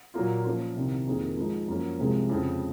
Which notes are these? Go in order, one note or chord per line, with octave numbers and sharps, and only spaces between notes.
A#2 F#3 A#3 F4
F3 A#3 C#4 F4
C2 C3 D#3
F2 D#3 A#3 D#4 G#4
F3 G#3 D#4
F#2 F3 A#3 C#4
C2 C3 F3 G#3
F2 C#3 F3